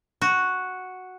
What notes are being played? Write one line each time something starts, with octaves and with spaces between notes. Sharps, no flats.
F#4